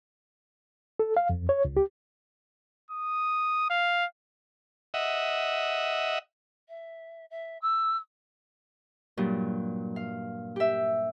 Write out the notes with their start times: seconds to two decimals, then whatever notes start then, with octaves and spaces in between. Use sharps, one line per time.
0.99 A4
1.17 F5
1.29 F2
1.49 C#5
1.65 C#2
1.77 G4
2.90 D#6
3.70 F5
4.94 D#5 E5 F#5
6.68 E5
7.30 E5
7.61 E6
9.17 G2 A#2 F#3
9.96 F5
10.56 G4 E5